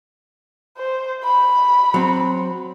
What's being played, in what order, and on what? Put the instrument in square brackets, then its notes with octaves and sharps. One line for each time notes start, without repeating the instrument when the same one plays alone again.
[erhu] C5
B5
[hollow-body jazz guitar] F#3 C4